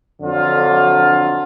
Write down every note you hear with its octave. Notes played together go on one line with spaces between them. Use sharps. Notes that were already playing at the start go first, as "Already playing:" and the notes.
F2 D3 F#3 D4 F4